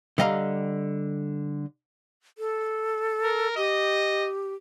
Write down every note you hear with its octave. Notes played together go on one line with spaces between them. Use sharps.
D3 G3 D#5 F5 A#5
A4
A#4
G4 D#5